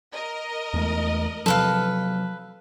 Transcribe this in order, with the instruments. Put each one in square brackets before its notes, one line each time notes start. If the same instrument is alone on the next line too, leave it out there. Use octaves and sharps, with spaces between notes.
[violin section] A#4 D#5
[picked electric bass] E2 G#3 A3
[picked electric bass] C3 F3 F#3 [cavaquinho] A4 B4 F5